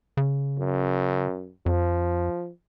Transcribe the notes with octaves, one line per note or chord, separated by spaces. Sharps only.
C#3
F#2
F2 F3